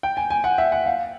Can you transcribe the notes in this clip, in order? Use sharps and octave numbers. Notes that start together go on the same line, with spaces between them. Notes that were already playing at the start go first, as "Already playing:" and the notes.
G5
G#5
G#5
F#5
E5
F#5
F5